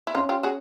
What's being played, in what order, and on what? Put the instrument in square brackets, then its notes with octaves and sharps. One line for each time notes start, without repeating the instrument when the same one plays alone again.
[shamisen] E4
[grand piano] C#4 [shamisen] D#4 F4
[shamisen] F4 G4
F#4 G#4